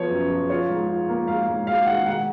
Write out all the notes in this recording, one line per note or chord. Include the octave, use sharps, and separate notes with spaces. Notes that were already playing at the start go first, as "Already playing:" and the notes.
Already playing: F3 B3 C#5
F#2
F3
F4 C#5
G#2
F4
A#3
G#2 F5
G#2
G#2 F5
D#3 F#5
G#2 F#5